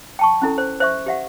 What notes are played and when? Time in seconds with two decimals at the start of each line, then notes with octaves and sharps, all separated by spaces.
0.19 G5 A5 C#6
0.42 C#4 E4 A4
0.58 C5
0.80 C5 E5 C#6
1.06 G4 E5 F#5